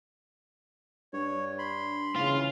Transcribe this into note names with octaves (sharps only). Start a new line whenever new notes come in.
G2 C#5
B5 C6
C#3 E3 F4